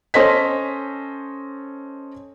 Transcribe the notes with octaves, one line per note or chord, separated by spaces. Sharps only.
C#4 A4 C5 D#5 B6